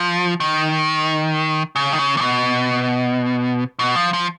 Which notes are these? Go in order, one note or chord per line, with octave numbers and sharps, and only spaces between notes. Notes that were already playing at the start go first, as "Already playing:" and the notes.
Already playing: F3
D#3
C#3
D#3
C#3
A#2
B2
B2
F3
F3